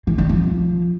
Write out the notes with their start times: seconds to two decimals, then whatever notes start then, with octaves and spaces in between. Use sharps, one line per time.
0.07 E3
0.18 D#3
0.29 F3